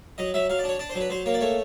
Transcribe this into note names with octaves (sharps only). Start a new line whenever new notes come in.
F#3 D#5
F#3 E5
F#3 F5
D5
D4
C#5
D4 D5
C5
F#3
B4
F#3 C5
A#3 C#5
D5
A3 C#5